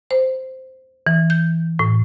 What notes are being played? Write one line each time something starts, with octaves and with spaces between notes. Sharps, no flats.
C5
E3
G6
A2